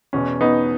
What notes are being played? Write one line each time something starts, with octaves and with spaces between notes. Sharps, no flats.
E2 B2 C#4
B3 D#4